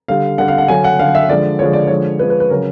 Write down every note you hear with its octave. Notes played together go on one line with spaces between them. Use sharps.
D3 G3 F5
D3 G3 F#5
F5
F#5
D3 F#3 G#5
F#5
D3 F#3 F5
E5
D3 F3 G#3 D5
D3 F3 G#3 C#5
D5
D3 F3 G#3 C#5
D3 F3 G#3 B4
B4
B4
C#3 F#3 A#4